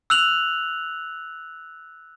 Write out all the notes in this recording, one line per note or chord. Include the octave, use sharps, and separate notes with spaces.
E6 F#6 F7 F#7